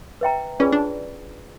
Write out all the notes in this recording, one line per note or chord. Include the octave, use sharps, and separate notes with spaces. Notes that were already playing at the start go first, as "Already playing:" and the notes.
B4 E5 G5 A#5
C#4 F4 G#4 B4 D5
D4